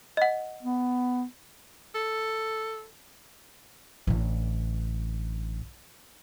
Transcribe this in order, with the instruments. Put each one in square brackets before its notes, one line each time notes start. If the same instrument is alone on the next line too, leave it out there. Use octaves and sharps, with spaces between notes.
[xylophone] D#5 F#5
[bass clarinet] B3
[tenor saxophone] A4
[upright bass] A1 D3